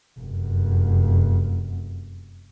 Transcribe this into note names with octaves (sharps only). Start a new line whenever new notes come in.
F1 F#2